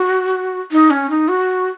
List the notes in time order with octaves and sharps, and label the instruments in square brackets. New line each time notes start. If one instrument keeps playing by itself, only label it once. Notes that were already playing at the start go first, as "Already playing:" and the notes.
Already playing: [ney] F#4
D#4
C#4
D#4
F#4